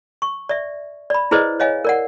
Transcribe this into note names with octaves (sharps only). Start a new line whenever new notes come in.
C#6
D5 E5
D5 B5
E4 G#4 B4 C5 D5 D#5
C#5 D#5 F5 G#5
A#4 D5 F#5